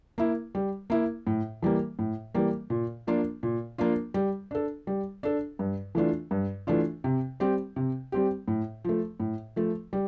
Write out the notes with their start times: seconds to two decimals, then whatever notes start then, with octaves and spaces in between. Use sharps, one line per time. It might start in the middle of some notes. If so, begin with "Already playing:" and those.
0.18 A#3 E4
0.55 G3
0.90 A#3 E4
1.27 A2
1.62 E3 G3 A#3
1.99 A2
2.35 E3 G3 A#3
2.70 A#2
3.07 F3 A#3 D4 F4
3.43 A#2
3.78 F3 A#3 D4 F4
4.14 G3
4.51 D4 A4
4.87 G3
5.23 D4 A4
5.59 G2
5.95 E3 A3 D4 F4
6.31 G2
6.67 E3 A3 D4 F4
7.04 C3
7.40 G3 C4 G4
7.76 C3
8.12 G3 C4 G4
8.48 A2
8.85 F3 A3
9.20 A2
9.56 F3 A3
9.93 G3